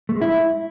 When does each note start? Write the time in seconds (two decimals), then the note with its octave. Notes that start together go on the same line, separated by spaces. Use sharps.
0.09 A3
0.15 G#3
0.21 E4